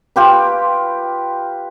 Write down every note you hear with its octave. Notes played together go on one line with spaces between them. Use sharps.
F4 G4 B4